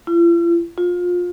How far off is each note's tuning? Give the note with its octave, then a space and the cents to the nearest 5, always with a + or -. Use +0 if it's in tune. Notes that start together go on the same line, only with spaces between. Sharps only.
F4 -45
F4 +25